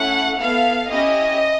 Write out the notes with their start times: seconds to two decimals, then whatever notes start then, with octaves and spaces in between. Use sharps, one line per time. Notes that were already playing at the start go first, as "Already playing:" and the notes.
Already playing: A3 C#4 E4 F#5
0.39 B3 E4 A4 F5
0.91 C#4 E4 G4 D#5